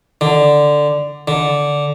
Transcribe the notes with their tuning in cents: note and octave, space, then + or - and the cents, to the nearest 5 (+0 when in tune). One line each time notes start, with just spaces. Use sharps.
D3 +5
D3 -10